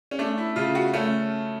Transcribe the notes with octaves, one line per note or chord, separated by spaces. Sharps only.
C#4
A3 D4
E4
C#3 F4
F#4
A3 C#4